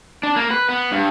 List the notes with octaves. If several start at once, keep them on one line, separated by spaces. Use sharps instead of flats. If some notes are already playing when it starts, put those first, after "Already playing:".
D4
A#3
B4
B3
G2